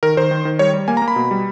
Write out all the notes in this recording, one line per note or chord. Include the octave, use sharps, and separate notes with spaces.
D#3 A#4
D#3 C5
D#3
D#3
G3 C#5
G3
A#3 G#5
A#5
A#3
B5
B2
G3